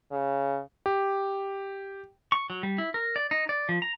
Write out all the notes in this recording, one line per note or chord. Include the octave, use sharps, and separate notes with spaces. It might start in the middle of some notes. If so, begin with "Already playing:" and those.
C#3
G4
C#6
F#3
G3
E4
A#4
D5
D#4
D5
F3
A#5